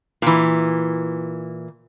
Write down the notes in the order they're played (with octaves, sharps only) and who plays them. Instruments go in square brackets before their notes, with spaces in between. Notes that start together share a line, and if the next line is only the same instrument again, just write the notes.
[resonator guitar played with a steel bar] A#2 E3